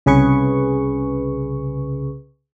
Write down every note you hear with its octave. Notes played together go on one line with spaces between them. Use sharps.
C2 C#3 G#4 B4 C#6